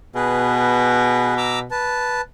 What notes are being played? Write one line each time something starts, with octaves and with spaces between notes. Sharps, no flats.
B2 G#4 B4
A#5 D6 E6
B4 A5